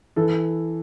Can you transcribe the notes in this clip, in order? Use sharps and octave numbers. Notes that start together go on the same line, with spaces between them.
E3 A4